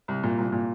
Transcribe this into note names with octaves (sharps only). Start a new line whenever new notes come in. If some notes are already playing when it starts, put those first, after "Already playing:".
C2
A#2
C2
A#2